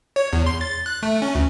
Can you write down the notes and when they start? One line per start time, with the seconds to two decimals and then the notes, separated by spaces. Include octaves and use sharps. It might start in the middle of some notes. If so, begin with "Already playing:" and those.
0.16 C#5
0.33 E2
0.46 C6
0.61 A6
0.86 F#6
1.03 A3
1.22 C#4
1.35 D2